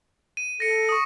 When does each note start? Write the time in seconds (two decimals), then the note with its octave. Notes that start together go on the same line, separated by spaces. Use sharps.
0.37 D#7
0.60 A4 A#6 C#7
0.89 C#6 D#6